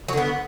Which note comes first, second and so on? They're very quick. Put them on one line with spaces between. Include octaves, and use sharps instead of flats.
F#3 D3 B3